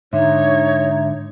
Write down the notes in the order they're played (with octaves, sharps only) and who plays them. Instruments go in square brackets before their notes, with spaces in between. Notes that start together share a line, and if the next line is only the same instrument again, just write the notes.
[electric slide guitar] G#2 D3 [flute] D#4 [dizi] C#5 [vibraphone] E5